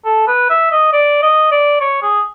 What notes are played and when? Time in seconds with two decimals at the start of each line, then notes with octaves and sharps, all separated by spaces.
0.05 A4
0.28 B4
0.50 E5
0.72 D#5
0.93 D5
1.22 D#5
1.51 D5
1.81 C#5
2.02 G#4